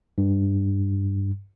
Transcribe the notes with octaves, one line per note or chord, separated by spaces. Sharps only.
G2